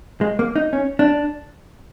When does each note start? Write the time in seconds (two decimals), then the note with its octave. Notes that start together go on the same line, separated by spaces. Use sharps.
0.21 G#3
0.39 A#3
0.56 D#4
0.73 C#4
0.99 D4